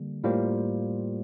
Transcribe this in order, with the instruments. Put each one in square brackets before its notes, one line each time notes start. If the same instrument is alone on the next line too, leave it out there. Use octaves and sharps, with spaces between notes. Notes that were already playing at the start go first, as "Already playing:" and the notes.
Already playing: [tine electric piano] D3 G3 A#3
A2 G3 A#3 F4 C5